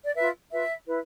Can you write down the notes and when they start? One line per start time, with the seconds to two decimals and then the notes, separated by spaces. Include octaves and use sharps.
0.05 D5
0.15 F4 B4 E5
0.51 F4 B4 E5
0.87 E4 B4